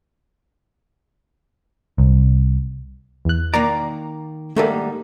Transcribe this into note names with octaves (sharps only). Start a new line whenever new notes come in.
C2
E2 F#6
D#3 A#3 D5 A#5
G#2 D#3 G3 A3 A#3 A4